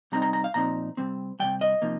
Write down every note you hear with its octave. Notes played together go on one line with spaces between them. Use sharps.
C3 G3 C4 D#4 A#5
A#5
A#5
F5
A#2 F3 C4 D#4 A#5
C3 G3 C4
C3 D#3 G3 G5
D#5
C3 F3 A#3 D#4